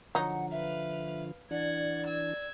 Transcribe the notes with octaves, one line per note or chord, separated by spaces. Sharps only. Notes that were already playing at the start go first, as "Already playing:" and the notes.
D3 F3 F#3 D#4 F#5
B4 E5 F5
E3 D4 D5 F#5 G#6
E6 G#6